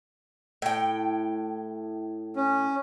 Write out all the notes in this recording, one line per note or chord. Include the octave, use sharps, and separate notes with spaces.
A2 G5
C#4